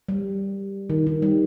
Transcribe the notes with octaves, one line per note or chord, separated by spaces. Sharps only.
G3
D#3
D#3
G3